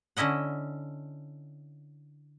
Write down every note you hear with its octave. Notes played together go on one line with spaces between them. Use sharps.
D3 C#4 E4 D#5 F#5